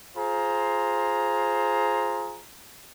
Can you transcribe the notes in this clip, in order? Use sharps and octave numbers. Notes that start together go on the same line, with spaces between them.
F4 G#4 C5 A#5